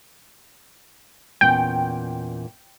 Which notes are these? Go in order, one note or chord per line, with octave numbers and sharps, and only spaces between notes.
E2 A#2 C#4 G5